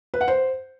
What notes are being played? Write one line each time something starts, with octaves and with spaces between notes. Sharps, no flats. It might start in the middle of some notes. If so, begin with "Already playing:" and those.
B4
F#5
C5